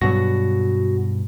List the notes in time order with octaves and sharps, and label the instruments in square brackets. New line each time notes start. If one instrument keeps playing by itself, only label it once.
[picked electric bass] G2 B2 F#3 [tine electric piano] F#4 A#6